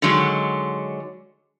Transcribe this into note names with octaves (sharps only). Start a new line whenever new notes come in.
D3 D#3 F#3 G#3